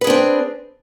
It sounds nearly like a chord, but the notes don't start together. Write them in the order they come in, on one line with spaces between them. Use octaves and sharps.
B4 G#4 D4 C4